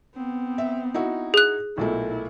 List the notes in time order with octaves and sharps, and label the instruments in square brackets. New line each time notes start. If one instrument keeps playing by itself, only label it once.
[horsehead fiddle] B3 C4
[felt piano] E5
D#4 E4 F#4
[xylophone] G#4 F#6
[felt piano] B1 A#2 A3 [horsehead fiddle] E4